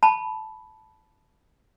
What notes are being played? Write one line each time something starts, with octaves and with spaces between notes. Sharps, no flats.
A5 B5